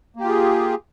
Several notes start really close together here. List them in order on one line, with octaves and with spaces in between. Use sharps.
A#3 G4 F4 G#4